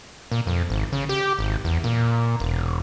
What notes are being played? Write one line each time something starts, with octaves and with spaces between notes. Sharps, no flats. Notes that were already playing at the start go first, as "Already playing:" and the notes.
A#2
F2
G#1
C#3
G4
G#1
E2
A#2
E1